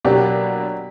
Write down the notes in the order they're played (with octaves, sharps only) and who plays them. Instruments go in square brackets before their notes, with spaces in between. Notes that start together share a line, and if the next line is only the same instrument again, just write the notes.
[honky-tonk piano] B2 F#3 A#3 D4 [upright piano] G4